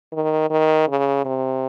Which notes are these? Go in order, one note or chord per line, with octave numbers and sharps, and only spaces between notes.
D#3
D#3
C#3
C3